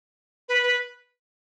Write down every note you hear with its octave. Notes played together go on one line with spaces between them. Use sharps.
B4
B4